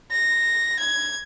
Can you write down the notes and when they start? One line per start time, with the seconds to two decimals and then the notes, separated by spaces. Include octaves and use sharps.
0.12 A#6
0.79 G#6